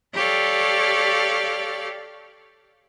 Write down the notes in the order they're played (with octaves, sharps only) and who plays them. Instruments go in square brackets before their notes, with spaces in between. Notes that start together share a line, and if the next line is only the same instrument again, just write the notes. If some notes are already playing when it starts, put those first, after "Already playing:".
[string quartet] G4 A4 C#5 D5 F5